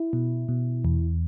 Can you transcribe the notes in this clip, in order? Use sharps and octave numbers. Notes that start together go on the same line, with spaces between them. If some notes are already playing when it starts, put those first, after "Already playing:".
Already playing: E4
B2
B2
E2